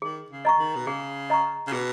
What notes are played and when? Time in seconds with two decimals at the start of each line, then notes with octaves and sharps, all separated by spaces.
0.02 D#3 G#4
0.30 C#3
0.45 D#5 A#5 C#6
0.58 D#3
0.76 B2
0.87 C#3 G#4
1.30 D#5 A#5 C#6
1.67 C#3
1.72 B2 G#4